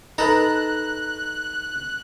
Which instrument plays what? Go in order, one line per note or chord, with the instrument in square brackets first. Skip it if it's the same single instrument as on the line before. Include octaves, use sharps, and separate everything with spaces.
[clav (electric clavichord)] D#4 B4 [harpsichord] A4 A#5 [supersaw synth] F#6